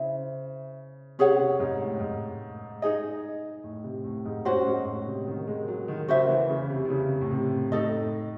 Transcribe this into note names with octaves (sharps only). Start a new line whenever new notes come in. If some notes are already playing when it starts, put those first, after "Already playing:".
Already playing: C#3 E4 C5 E5
C3 C#4 G#4 C#5 F#5
C3
G#2
A2
G#2
D#4 G#4 D#5
A2
C3
A2
G#2
A2 C#4 F#4 C5
G#2
A2
C3
D#3
G#3
F#3
D#3
C#3 F#4 C5 E5
E3
C#3
C3
C3
C#3
A2
C3
A2 D#4 A4 D#5